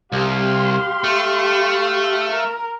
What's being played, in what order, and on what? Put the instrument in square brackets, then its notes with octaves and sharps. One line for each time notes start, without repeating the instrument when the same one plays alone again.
[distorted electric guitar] C2 [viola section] G4 C6 [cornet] F5
[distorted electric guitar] A3
[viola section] A#4